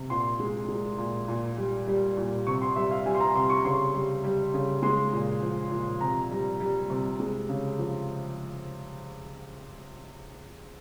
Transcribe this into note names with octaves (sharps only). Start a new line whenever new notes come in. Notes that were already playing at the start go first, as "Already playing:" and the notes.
Already playing: C3
A#2 C6
G#3
G#3
A#2
A#2
G3
G3
A#2
C3 C#6
C6
G3 E5
F5
G3 G#5
C6
A#5
C3 C6
C#6
C#3 C6
G3
G3
C#3
G#3 C6
A#2
F3
A#2
C3 A#5
G3
G3
C3
G#3
C#3
F3